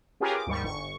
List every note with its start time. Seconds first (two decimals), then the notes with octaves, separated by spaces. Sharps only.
0.20 C#4 F4 G4 G#4 A#4 B4
0.34 D6
0.47 D#2 G#2 G3 C#6
0.63 G1 C#6